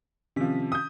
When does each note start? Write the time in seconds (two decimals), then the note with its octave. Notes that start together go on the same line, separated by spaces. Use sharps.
0.36 C3 D#3 F3 C#4 B6
0.72 D#6 G6